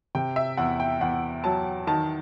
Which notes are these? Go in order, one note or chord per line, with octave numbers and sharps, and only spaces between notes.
C3 G5
E5
E2 F#5
G5
E2 F#5
F#3 A5
D#3 A5